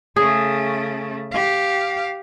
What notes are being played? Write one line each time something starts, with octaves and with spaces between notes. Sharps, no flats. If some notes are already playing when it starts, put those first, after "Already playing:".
C#3 A3 G#4
G4 F5